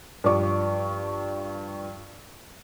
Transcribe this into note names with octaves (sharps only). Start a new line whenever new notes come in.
G2 F3 D5 C#6